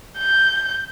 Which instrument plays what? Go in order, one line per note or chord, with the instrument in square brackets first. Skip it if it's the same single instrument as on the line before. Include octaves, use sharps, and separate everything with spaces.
[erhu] G6